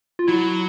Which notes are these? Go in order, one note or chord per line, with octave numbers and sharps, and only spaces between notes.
F4
F#3 E4